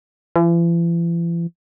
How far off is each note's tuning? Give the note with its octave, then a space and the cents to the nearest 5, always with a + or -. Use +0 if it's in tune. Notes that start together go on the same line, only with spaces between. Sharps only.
E3 +45